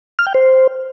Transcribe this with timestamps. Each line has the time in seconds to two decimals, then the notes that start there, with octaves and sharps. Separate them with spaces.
0.19 F6
0.27 G5
0.34 C5